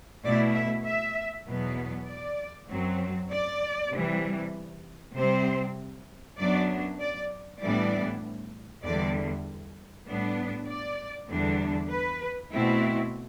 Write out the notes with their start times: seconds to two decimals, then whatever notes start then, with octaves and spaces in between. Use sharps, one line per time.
0.23 B2 A3 E4 D5
0.54 E5
0.85 E5
1.46 E2 B2 F#3 B3
2.07 D5
2.69 F#2 F#3 C4
3.31 D5
3.92 C3 E3 G3
5.15 C3 G3 C4 C5
6.37 F#2 F#3 B3 D4 D5
6.99 D5
7.61 A2 E3 G3 B3 D4 D5
8.84 E2 D3 G3 D5
10.06 A2 G3 B3 D4
10.67 D5
11.29 E2 D3 G3 D4
11.90 B4
12.52 B2 A3 C4 E4